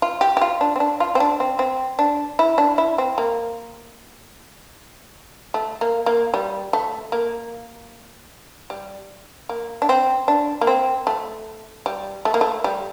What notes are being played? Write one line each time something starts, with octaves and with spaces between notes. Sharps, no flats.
F4
G4
G4
F4
D4
C4
D4
F4
C4
D4
C4
C4
D4
E4
D4
E4
C4
A#3
A3
A#3
A#3
G3
A3
A#3
G3
A#3
D4
C4
D4
A#3
C4
A3
G3
A3
A#3
A3
G3